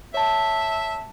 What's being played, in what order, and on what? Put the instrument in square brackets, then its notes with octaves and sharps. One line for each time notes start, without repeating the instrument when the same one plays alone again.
[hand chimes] C#5 A5 [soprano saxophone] E5